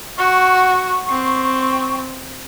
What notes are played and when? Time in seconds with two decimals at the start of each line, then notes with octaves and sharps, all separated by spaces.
0.18 F#4 C#6
1.09 C4